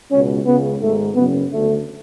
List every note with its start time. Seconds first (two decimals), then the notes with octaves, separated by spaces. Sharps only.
0.11 C#2 B2 C#4
0.46 C#2 C#3 B3
0.81 G#1 G#2 A3
1.15 F#1 F#2 C#3 B3
1.50 D2 D3 A3